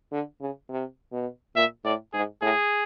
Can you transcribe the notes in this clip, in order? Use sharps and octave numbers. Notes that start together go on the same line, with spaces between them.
D3
C#3
C3
B2
A#2 E5
A2 D5
G#2 G#4
A2 G#4